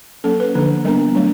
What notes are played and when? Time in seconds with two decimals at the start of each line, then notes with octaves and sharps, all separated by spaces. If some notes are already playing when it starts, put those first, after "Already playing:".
0.24 F#3 A#3 C#4 A4
0.40 B4
0.55 D3 F3 A#3 D4
0.85 G3 B3 D4 A#4
1.15 F#3 A3 D4